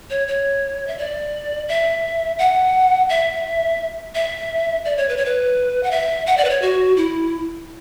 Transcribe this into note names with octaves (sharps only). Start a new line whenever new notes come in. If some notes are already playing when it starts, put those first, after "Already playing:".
C#5
C#5
E5
D5
E5
F#5
E5
E5
D5
C#5
B4
C#5
B4
F#5
E5
F#5
D5
B4
C#5
F#4
E4